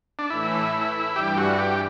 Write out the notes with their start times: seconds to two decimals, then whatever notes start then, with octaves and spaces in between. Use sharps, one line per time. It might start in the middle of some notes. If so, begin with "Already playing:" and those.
0.19 D4
0.30 A2 E3 A3 E4
1.16 G2 E3 G3 G4
1.38 F#4
1.59 G4